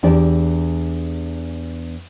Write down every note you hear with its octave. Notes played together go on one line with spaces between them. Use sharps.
E2 D4 G4 D5